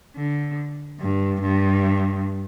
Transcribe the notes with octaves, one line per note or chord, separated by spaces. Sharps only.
D3
G2
G2